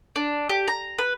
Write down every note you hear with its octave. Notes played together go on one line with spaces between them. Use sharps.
D4
G4
A#5
B4